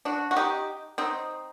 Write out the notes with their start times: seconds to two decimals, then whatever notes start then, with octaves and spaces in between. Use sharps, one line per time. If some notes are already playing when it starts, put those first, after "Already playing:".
0.05 D4 F#4
0.31 F#4
0.36 D#4 G4
0.98 C4 D#4